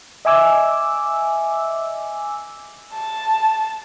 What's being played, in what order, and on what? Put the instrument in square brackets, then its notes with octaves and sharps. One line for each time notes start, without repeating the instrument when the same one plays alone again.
[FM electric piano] D#5 E5 G#5 D6 E6
[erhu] A5